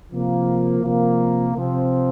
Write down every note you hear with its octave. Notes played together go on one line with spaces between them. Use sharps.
C3 F3 A#3
C3 F3 A#3
C3 F3 C4